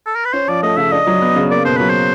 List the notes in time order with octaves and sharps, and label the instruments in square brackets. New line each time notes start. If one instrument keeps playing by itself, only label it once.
[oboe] A4
A#4
B4
[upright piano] C#4 [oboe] C5
[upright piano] F3 [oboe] D5
[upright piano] A3 [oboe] D#5
[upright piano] C#3 [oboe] E5
[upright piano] D4 [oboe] D#5
[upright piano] F#3
B3
C#3
[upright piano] A#3 [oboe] D5
[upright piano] B2 [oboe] C5
[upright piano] F#3 [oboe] B4
[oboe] C5